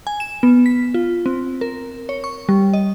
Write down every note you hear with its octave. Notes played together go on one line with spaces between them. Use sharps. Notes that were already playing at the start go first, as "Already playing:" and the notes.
G#5
E7
B3
B6
F4
C4
A#4
C#5
C#6
G3
D#5